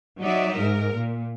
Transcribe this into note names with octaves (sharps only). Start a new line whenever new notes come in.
F#3 D#4 D5 E5
G#2 A#4
A#2